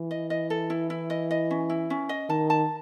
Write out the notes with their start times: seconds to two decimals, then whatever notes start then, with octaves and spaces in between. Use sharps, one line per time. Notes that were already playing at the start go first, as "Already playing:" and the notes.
Already playing: E3
0.11 D#5
0.30 D#5
0.50 A4
0.70 E4
0.90 E4
1.10 D#5
1.31 D#5
1.51 C#4
1.70 E4
1.90 C#4
2.09 D#5
2.29 D#3 A5
2.50 A5